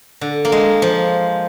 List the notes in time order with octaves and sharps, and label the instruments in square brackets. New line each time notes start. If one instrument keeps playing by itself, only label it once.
[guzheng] D3
A#3
G#3
F3